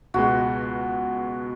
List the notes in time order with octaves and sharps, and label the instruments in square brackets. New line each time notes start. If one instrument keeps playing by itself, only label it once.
[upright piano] C#2 B2 G#3 [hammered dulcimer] F#4